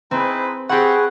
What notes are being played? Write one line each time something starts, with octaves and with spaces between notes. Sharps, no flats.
C4 D#4 E4 G#4 B4 C5 G5
C4 G4 G#4 B4 F#5 G#5 C#6